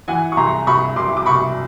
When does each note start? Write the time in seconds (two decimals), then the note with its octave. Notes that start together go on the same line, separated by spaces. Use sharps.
0.08 E3 F#5 G#5
0.32 C#6
0.37 C2 A#5 C6
0.67 C2 B5 C#6
0.96 C2 C6 D6
1.17 D6
1.26 C2 B5 C#6